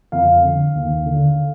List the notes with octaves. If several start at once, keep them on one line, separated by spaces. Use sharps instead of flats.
F2 F5
D3
D#2
D3